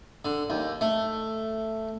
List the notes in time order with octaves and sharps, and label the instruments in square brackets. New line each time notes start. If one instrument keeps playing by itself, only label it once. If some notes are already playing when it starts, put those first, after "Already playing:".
[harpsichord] D3
D#2
A3